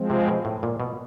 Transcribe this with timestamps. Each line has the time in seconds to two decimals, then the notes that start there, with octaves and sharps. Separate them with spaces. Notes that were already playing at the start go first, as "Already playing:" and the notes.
Already playing: F3 G#3 C4
0.10 C3
0.27 B2
0.45 A2
0.63 A#2
0.80 B2